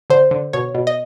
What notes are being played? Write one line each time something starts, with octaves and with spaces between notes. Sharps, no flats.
D3 C5
D3
B2 C#5
B2
D#5